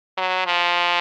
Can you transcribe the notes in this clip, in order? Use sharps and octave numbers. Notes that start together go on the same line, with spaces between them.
F#3
F3